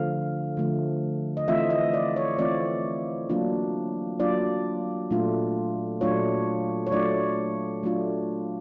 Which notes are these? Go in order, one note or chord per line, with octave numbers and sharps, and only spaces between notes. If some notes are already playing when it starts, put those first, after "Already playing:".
Already playing: D3 F3 A3 F5
D3 F3 A3
D#5
E3 A3 C4 F4 E5
D#5
D5
C#5
E3 A3 C4 F4 D5
F#3 A#3 D4 F4
F#3 A#3 D4 F4 D5
A#2 F#3 A3 D4 F4
A#2 F#3 A3 D4 F4 C#5
C#5
F#3 A3 D4 F4 D5
F#3 A3 D4 F4